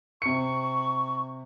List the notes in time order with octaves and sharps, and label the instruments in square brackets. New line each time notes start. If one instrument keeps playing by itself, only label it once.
[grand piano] C3 C#7 [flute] C#6